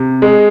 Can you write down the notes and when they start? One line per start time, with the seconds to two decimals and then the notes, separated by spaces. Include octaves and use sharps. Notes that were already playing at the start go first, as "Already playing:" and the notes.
Already playing: C3
0.22 G#3